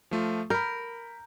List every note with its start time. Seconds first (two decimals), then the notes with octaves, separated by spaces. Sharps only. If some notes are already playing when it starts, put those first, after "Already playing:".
0.11 F3 A3 F4
0.50 A#4 B5 G6